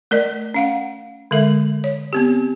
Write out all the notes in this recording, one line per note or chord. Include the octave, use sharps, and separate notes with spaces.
A3 A#4 D5 D#5
C#4 F5 F#5
D3 G#3 A4 E5
C#5
B3 C4 G4